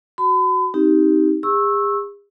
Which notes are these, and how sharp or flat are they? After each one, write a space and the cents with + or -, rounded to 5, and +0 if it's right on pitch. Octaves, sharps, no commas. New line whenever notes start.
F#4 +0 B5 +40
C4 +0 D#4 +15 G4 -10
G#4 -45 C#6 -25 E6 -5